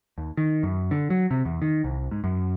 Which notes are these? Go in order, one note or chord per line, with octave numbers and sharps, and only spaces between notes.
D#2
D#3
F#2
D3
F#3
C3
E2
D#3
C2
G#2
F#2